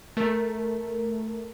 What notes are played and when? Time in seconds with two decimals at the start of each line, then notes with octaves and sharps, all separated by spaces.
0.17 A3 A#4